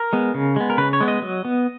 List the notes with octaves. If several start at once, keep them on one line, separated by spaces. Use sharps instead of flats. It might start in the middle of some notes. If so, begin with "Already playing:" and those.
Already playing: A#4
G#3 B3
C#3
G#3 B3
A#4
C#3 B4
C#5
G#3 B3
D#5
F#3
B3